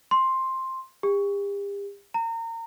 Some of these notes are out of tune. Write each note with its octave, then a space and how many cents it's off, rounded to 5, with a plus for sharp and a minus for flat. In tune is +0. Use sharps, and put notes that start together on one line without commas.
C6 +10
G4 +40
A#5 -30